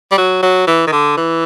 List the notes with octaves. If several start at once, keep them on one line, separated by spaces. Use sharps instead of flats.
G3
F#3
F#3
E3
D#3
D3
E3